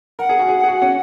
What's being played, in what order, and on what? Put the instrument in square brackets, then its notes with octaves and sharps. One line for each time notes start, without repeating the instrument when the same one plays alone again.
[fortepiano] A#4 [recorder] F#5
[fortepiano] G#4
F#4
G#4
G#4
F#4
C#4